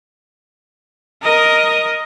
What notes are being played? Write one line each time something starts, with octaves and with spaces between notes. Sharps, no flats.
A#4 D#5